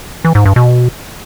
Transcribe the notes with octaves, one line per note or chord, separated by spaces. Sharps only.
E3
G#2
G2
B2